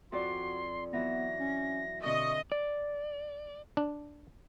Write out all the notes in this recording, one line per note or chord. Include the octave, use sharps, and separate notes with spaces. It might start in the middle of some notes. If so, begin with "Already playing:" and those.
F2 F#4 D5 C6
E3 F#3 B3 A#6
C#4
B2 D3 C4 D#5 C#6
D5
D4